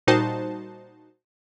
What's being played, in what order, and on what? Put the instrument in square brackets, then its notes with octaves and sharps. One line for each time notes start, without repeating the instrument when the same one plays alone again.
[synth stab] A#2 G3 D#4 F#4 C5 A5